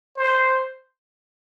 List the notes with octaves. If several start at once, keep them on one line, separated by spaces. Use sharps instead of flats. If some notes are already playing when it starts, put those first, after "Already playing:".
C5